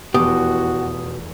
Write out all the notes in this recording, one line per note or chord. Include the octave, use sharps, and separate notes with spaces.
F1 E2 B2 F#4 G4 F#5 D#6